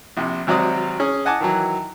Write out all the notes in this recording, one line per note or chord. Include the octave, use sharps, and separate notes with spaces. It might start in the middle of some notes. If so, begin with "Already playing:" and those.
A#1 C3
G#1 C3 F#3 C5 D5 D#6
C#4 G#4
D#5 F#5 G#5 A5 D6
D#3 E3 F#3